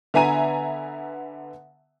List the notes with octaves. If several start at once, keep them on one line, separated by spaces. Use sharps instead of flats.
D3 B3 E5 G#5 A#5 D#7